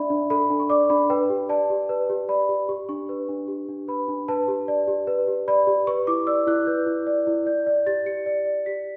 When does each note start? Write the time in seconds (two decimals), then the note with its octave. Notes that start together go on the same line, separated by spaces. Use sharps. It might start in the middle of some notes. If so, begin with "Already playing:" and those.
Already playing: D4 D5 E5 B5
0.10 D4
0.30 A4 B5
0.50 D4
0.60 C#6
0.70 D5 D6
0.90 D4 B5
1.10 B4 G5
1.30 G4
1.49 D5 A5
1.70 G4
1.89 B4
2.10 G4
2.29 D5 B5
2.49 G4
2.69 G4 C#6
2.89 D4 C#6
3.09 B4
3.29 D4
3.48 G4
3.69 D4
3.88 B4 B5
4.08 D4
4.28 B4 A5
4.48 G4
4.68 D5
4.88 G4
5.07 B4
5.28 G4
5.48 D5 B5
5.67 G4
5.87 B4 C#6
6.07 E4 D6
6.27 D5 E6
6.47 E4 F#6
6.67 B4 G6
6.87 E4
7.07 D5
7.27 E4
7.46 D5 G6
7.67 D5
7.86 G4 A6
8.06 G4 C#7
8.26 D5
8.46 D5
8.66 G4 B6